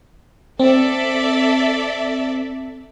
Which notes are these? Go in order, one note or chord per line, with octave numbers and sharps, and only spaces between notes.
C4 A4 D5 E5